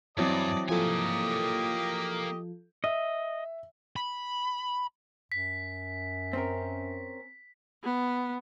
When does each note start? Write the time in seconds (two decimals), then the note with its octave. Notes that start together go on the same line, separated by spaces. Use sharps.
0.18 G2 E3 F#3 C4 D5 D#5 A5
0.69 F3 A#3 F4 G4 A4 D#5 G#5
2.84 D#5 E5
3.96 B5
5.32 F#2 B6
6.33 C4 C#4 A#4
7.83 B3